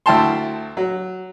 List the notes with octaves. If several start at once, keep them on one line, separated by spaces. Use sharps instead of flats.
D2 E4 G5 A5 C6
F#3